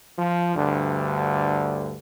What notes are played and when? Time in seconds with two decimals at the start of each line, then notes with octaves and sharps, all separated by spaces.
0.17 F3
0.55 D2 G2 D3